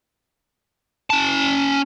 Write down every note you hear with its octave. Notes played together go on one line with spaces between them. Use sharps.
C#4 A5